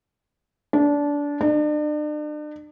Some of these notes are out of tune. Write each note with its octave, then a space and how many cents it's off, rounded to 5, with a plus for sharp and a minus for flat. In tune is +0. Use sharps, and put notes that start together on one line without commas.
D4 -20
D4 +40